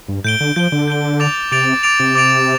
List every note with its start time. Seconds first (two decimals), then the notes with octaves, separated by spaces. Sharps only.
0.08 G2
0.24 A2 G6 D7 G7
0.40 D3
0.56 F3 G6 D7 G7
0.72 D3
0.88 G6 D7 G7
1.20 D6 A6 D7 F7
1.51 C3 D6 A6 D7 F7
1.83 D6 A6 D7 F7
2.00 C3
2.15 D6 A6 D7 F7